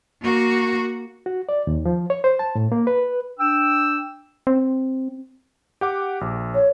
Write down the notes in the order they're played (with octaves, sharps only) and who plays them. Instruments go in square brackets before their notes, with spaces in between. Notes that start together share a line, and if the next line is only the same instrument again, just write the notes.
[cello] A#3 F#4
[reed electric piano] F#4
D5
D#2
F3
C#5
C5
A5
A2
A#3
B4
[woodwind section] D4 G5 E6
[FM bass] C4
[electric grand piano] G4 F#5 D6
A#1
[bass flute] C#5